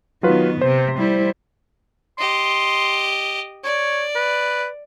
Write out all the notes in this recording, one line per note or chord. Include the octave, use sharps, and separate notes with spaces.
D#3 F#3 B3 F4 B4
C3 C5
G3 E4
G4 D#5 C6
C#5 D5
B4